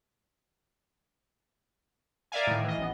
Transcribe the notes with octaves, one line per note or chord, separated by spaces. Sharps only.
A#4 D5 E5 F5 G#5
A2 D#3
E3 D#5
A1 B3